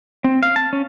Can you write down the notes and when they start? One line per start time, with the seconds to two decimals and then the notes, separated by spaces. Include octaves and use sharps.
0.24 C4
0.43 F5
0.56 A5
0.73 C#4